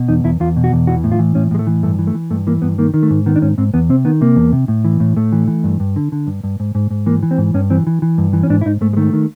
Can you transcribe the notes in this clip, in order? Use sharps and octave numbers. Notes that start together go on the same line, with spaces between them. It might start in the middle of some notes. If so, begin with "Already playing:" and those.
Already playing: B2
E2 D#4
E2 E4
E2 F4
B2
F#4
E2
E3 F#4
A2
F4
E3
A2 C#4
A2 G#3
A3
E3
G2 A3
E3
A3
E3
G2 A3
E3 A#3
G2 B3
D#3 A#3
D#3
A3
G#2
D#3 B3
D4
G#2 C#4
G#2 C4
E2 B3
C3 C4
D#3 B3
C3 A#3
E2
C3
A2
E3
A2
A2 A3
E3
E3
G2
G2
D3
D3
G2
G2
G#2
G#2
G#2
E3 A#3
E3
C4
G#2
G2 C#4
E3 C4
E3
E3
G2
E3
C#4
G#2 D4
E4
G#2 D#4
G#2 A3
G#3
D#3 A3
D#3